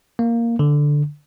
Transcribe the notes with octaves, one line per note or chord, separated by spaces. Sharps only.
A#3
D3